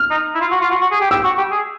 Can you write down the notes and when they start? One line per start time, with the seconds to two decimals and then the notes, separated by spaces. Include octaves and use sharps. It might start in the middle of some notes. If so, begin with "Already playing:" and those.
Already playing: F6
0.10 D#4
0.35 E4
0.40 F4
0.51 F#4
0.61 F4
0.71 F#4
0.81 F#4
0.91 G#4
1.01 G4
1.11 G4 E6
1.24 F#4
1.38 G4
1.51 G#4